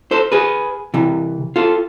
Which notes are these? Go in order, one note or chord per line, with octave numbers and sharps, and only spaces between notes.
A4 C5
G#4 B4
C3 E3
F4 A4